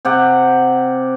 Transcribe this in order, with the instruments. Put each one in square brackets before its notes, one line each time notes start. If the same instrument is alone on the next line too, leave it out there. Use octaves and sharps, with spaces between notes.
[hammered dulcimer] C3 G4 F#5